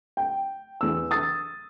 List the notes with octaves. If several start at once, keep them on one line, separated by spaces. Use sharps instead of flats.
G5
E2 E6
D#6 A6